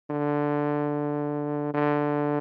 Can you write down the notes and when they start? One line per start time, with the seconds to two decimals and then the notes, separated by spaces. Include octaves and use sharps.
0.11 D3
1.74 D3